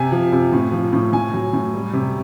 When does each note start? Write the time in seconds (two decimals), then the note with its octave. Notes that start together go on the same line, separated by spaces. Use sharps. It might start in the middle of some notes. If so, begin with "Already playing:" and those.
Already playing: C3 G#5
0.12 F3
0.32 C3
0.52 A2
0.72 F3
0.93 A2
1.13 A2 G#5
1.33 F#3
1.53 A2
1.74 G3
1.93 C3